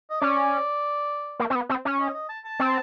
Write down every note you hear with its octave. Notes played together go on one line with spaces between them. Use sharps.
D#5
C#4 D5
A#3
C4
B3
C4
C#4
D#5
D#5
A5
A5
C4